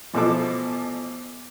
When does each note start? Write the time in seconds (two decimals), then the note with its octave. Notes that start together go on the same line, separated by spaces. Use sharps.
0.14 A1 B2 F3 A4 D6